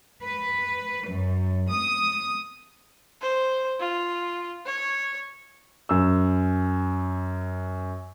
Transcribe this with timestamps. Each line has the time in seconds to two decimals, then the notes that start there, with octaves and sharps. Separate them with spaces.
0.23 B4
1.07 F#2
1.70 D#6
3.21 C5
3.80 F4
4.66 C#5
5.89 F#2 E6